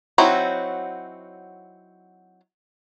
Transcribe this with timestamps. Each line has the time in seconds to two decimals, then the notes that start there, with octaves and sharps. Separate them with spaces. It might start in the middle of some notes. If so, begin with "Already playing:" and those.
0.18 F#3 C4 D#4 E4 F#4